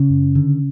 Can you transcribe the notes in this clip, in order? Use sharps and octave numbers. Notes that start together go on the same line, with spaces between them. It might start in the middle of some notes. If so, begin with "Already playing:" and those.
Already playing: C#3 C#4
F#2
D3